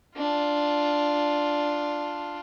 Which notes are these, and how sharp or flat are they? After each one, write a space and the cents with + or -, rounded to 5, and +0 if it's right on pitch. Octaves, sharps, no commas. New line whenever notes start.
D4 +0 F4 +0